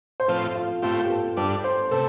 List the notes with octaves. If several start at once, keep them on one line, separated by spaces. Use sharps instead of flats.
C5
A2 F3 C4 F4 A4
F4
A2 A3 C4 F4 G4
G4
A4
G2 G3 D4 A4
C5
C3 A3 A4